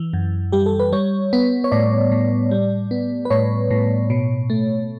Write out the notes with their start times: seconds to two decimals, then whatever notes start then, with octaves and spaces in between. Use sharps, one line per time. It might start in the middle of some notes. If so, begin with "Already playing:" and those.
Already playing: E3
0.13 F#2
0.52 G3 G4
0.66 A4
0.80 B4
0.92 G3 C#5
1.33 B3
1.64 C#5
1.72 A2 D5
2.12 A2
2.51 G3
2.91 B3
3.25 B4
3.30 A2 C#5
3.71 A2
4.10 B2
4.50 A3